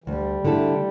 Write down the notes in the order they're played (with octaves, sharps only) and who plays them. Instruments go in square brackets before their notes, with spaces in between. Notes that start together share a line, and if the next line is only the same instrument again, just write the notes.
[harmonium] E3
[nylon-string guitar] D2 [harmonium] G3
[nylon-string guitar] D3 A3 E4 A4